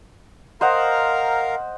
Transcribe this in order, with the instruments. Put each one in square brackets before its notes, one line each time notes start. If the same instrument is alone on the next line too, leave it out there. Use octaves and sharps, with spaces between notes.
[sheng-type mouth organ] A#4 F5 A#5 [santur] C5 D#5 F#5